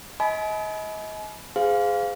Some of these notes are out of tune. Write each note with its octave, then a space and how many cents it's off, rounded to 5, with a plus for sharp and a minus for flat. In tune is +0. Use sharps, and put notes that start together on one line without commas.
D#5 +35 G#5 +40 B5 +0
G#4 +0 C5 -35 F5 +0